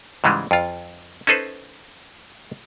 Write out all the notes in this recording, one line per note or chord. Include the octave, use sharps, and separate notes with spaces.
G#2 C#3 E3 G3 G#3
F2 F4
C#4 D#4 A4 B4 C5